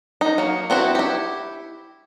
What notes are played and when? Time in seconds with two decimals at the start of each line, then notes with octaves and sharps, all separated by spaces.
0.21 D#4
0.38 F#3 A#3
0.70 B3 C4 E4 F#4
0.95 E4 G4